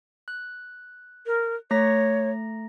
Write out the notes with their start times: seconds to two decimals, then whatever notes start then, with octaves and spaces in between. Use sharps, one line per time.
0.28 F#6
1.26 A#4
1.71 A3 C#5 A#5 A#6